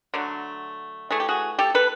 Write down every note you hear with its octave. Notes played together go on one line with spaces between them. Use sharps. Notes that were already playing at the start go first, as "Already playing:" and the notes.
D3 F#3 A3
E3 A3 G#4
G4
F#4 G#4
G4 A4
A4 B4